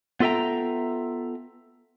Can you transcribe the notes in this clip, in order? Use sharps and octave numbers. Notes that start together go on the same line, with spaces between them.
B3 F4 A4 E5 G5 A#5